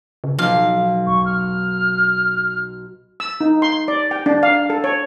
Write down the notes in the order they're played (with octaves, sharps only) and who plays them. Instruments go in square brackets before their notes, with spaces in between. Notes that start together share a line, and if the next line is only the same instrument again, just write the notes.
[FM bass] C#3
[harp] B1 [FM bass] F3 [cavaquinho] F5
[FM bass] F1 [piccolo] C#6
[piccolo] F6
[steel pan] E6
D#4
C6
D5
G5
D4
F5
A4
C#5